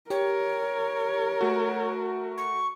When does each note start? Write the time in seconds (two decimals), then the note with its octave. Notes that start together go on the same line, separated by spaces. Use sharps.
0.10 G4 A#4 C#5
1.41 A3 F#4
2.38 C#6